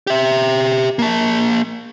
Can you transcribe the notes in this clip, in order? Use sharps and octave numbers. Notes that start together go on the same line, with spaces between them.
G4 E5
A#3 A5